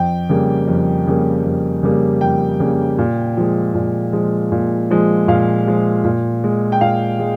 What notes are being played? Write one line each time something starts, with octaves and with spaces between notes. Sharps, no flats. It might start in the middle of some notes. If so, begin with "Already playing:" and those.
Already playing: F2 G5
C#3 G3 A#3
F2
C#3 G3 A#3
F2
C#3 G3 A#3
F2 G5
C#3 G3 A#3
A#2
F3 G#3
A#2
F3 G#3
A#2
F3 G#3
A#2 F5
F3 G#3
A#2
G#3
G5
A#2 F5
G#3